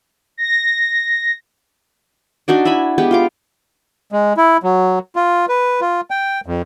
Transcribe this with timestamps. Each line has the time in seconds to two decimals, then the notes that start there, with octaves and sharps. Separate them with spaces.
0.37 A#6
2.48 D4 D#4 F#4 D5
2.65 E4 E5 G#5 B5
2.98 G#3 B3 G4 B4
3.11 F4 F5 D6
4.12 G#3
4.37 E4
4.63 F#3
5.16 F4
5.49 B4
5.81 F4
6.11 G5
6.46 F2